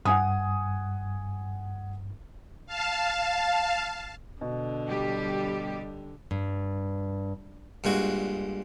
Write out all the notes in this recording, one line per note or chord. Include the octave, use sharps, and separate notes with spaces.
G2 F#5 G#5 D#6
F5 A5
B2 D3
G3 G4
G2
G2 A#2 G#3 F#4